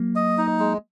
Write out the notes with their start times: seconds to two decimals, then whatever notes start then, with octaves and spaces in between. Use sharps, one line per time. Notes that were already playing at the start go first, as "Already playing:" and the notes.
Already playing: F#3 A#3
0.16 D#5
0.38 D#4
0.59 G#3